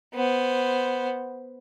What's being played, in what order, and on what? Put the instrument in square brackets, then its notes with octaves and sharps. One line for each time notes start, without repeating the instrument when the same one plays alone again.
[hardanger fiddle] B3 C5